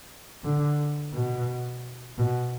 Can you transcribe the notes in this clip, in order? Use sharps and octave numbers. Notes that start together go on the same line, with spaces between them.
D3
B2
B2